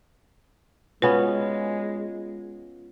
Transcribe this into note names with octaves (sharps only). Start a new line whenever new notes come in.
G#3 B3 C#4 F4 F#4 B4